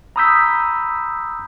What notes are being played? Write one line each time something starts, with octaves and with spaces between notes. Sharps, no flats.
A#5 B5 D#6 E6 G6 B6